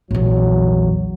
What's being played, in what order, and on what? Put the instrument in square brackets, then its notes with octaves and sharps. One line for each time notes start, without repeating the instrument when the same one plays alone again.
[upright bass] A#1 E2 [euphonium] F#3